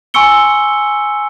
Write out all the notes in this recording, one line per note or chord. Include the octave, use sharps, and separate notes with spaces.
G#5 C6 C#6 E6 C#7 G7